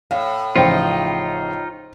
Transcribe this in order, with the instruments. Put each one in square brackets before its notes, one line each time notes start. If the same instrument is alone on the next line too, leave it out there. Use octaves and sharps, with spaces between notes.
[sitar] A2 [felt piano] F5
[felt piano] A1 C#3 F3 [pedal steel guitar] D#4 F4 [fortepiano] C5 G5